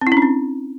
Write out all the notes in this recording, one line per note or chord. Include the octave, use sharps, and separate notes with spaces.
C4
E4
C#4
D4
C4